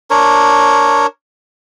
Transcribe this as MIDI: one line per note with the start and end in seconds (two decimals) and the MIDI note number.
0.10 1.07 62
0.10 1.07 70
0.10 1.07 73